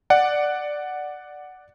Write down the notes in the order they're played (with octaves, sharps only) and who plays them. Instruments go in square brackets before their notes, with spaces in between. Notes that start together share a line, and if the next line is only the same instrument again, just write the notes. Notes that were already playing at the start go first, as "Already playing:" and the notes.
[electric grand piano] D5 F#5